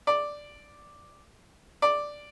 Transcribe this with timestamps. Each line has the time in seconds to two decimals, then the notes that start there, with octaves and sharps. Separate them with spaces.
0.07 D5
1.82 D5